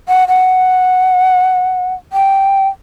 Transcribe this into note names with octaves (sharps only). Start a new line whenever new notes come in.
F#5
F#5
G5